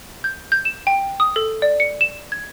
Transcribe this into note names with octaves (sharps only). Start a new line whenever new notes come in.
G6
G6
E7
G5
D#6
A4
D5
C#7
E7
G#6